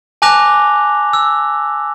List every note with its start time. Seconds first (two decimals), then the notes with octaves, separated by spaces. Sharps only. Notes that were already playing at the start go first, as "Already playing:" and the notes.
0.22 G#5 A5 D6 F#6 A#6 F7
1.13 E6